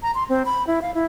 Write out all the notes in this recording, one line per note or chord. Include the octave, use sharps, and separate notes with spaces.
A#5
C6
C4
B5
E4
F5
E4